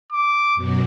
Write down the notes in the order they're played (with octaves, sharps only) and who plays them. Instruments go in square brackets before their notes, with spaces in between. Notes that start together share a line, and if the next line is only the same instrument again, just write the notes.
[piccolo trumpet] D6
[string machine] F#2 B2 F#3